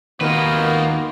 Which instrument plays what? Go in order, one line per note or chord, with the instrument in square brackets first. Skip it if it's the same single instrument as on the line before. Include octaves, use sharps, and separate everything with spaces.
[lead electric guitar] D#2 [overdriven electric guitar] A#3 B4 [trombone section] B3 F4 F#4 [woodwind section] D#4 A#4